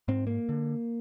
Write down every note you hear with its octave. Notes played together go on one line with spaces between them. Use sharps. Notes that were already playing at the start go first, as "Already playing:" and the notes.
G#2 C4
A#3
D3